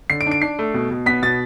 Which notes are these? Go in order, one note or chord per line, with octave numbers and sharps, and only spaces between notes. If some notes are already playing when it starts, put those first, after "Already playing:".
D3 C7
D7
D4
D7
D4 C7
A3
B2
B2
B3 B6
B2 A6